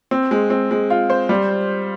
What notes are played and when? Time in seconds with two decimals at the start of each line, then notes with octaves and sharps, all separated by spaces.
0.11 C4
0.31 G#3
0.50 C4
0.71 G#3
0.90 F4
1.10 C5
1.29 G3